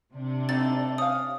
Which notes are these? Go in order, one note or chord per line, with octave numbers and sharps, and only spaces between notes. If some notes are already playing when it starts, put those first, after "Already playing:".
C3 D4
D3 A3 C4 D#4 A6
C#4 F5 D#6